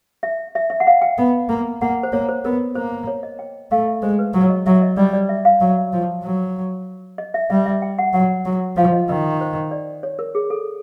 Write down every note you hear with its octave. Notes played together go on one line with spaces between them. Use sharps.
E5
E5
E5
F#5
F5
G5
B3
A#3
A#3 F#5
C5
A#3 C#5
C5
B3 A#4
A#3 C5
C#5
D#5
G5
A3 F5
E5
G#3 C5
B4
F#3 C#5
D#5
F#3 E5
D#5
G3 D5
D5
E5
F5
F#3
F3
F#3
D#5
E5
G3 E5
E5
G5
F#5
F#3 F#5
F#3
F3 F5
D#5
D#3 D#5
C5
D5
C#5
A#4
G#4
A4